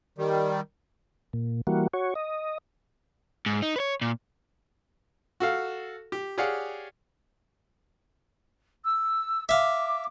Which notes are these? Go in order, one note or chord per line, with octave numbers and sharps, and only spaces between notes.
D#3 G3
A#2
E3 G3 A#3 F#4
F#4 C#5
D#5
G#2
D#4
B4 C#5
A#2
F#4 A4 F5
G4
G4 G#4 C#5 D5 F5 F#5
E6
E5 F5 D6